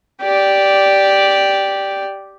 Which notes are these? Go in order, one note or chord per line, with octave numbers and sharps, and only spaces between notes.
G4 D5